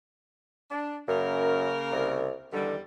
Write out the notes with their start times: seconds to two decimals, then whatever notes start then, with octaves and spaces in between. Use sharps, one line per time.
0.70 D4
1.08 F#2 C#3 A#3 A#4
1.92 C2
2.53 E2 D3 D#3 G3